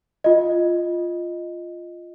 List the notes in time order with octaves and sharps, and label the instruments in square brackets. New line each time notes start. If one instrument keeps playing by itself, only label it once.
[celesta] F4 D#5